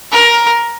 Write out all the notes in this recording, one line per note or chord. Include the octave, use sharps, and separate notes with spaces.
A#4